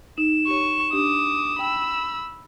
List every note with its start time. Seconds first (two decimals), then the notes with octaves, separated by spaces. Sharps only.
0.18 D#4 E7
0.47 G4 C#5 C#6
0.93 D4 G4 D6 D#6
1.59 G5 B5 E6